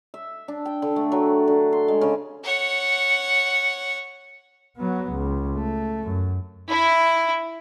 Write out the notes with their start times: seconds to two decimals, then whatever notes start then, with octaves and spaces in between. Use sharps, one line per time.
0.14 E5
0.48 D4
0.65 G5
0.82 D3
0.96 A3
1.12 F#3
1.48 D3
1.73 C6
1.88 G#3
2.01 C#3
2.44 C#5 F#5
4.77 F#3 B3
5.12 C#2
5.54 A3
6.04 F#2
6.69 E4